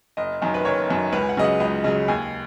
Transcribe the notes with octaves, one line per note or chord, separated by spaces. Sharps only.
F#1 D#5
F#2 D#3
B4
F#1 C#5
F#2 D#3
C#2 B4
G#5
F#5
C#3 F#3 D#5
F#5
C#2 D#5
C#3 F#3 D#5
D#2 G#5